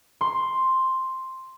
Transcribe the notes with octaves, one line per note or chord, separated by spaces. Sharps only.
C6